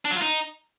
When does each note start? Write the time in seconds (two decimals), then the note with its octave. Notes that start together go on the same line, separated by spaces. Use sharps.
0.05 D4
0.11 F#3
0.16 F4
0.22 D#4